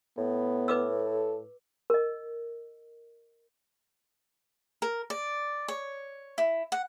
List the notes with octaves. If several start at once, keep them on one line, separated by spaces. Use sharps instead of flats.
A2 B3
B4 D6 E6
A4
A#4 D#5
A#4
D5
C#5
E4
F#5